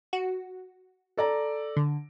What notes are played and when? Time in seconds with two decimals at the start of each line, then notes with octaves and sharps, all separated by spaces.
0.13 F#4
1.17 A4 D5 A#5
1.76 D3